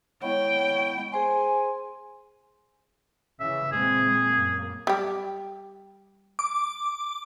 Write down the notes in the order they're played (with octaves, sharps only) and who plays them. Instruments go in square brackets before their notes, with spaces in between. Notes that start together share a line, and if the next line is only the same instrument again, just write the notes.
[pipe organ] G#3 B3 E4 [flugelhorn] C#5 [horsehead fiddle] G5
[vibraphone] G#4 C5 C6 [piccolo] G#5
[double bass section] C#3 E3 [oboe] E5
[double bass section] A#2 G#3 C4 [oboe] G#4
[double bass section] F#2 A#3
[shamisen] G3 G4
[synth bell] D6